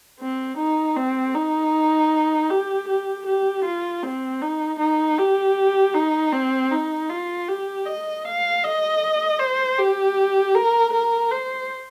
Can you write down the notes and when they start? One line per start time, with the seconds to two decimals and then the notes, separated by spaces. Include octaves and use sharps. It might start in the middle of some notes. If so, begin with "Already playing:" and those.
0.20 C4
0.58 D#4
0.96 C4
1.35 D#4
2.50 G4
2.89 G4
3.27 G4
3.65 F4
4.03 C4
4.42 D#4
4.80 D#4
5.19 G4
5.94 D#4
6.33 C4
6.72 D#4
7.10 F4
7.49 G4
7.86 D#5
8.25 F5
8.63 D#5
9.39 C5
9.78 G4
10.55 A#4
10.93 A#4
11.32 C5